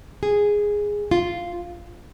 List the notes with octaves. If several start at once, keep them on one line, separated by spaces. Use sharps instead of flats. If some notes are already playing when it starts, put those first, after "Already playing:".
G#4
F4